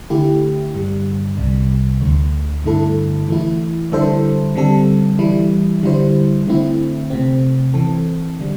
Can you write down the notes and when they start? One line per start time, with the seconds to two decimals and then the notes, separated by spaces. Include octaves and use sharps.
0.10 D3 A3 E4 G4
0.74 G2 D3 G3
1.37 C2 C3 G3
2.01 D2 D3 A3
2.64 G2 D3 A3 E4 A4
3.28 E3 A3 E4
3.92 D3 G3 E4 A4 C5
4.55 D3 G3 C4 A4
5.19 E3 G3 E4
5.83 D3 G3 E4 C5
6.46 D3 A3 C4 E4
7.10 C3 A3 C4
7.74 E3 C4 A4
8.39 D3 G3